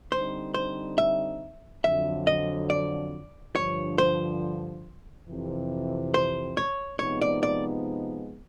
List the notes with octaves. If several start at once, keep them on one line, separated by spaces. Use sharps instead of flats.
D3 G3 C4 D#4 C5
C5
E5
F2 D3 F#3 E5
D#5
D5
G2 D3 F3 C#5
C5
F2 C3 E3
C5
C#5
C3 F3 G#3 B3 D#4 C#5
D5
D5